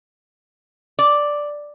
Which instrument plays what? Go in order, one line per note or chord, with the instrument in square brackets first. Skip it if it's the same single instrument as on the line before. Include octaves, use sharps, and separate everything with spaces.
[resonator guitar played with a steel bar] D5